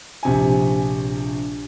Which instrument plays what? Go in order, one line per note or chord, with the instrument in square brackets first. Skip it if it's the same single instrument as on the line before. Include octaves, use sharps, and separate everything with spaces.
[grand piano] A#1 C3 G#5